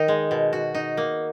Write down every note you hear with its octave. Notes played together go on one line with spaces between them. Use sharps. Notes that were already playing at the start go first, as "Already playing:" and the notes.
Already playing: D#3 D#4 A#4
G#3
B2
F#4
D#4
A#3